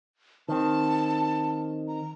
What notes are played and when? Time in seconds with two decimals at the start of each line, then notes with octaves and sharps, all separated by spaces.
0.49 D#3 C4 A5
1.88 A#5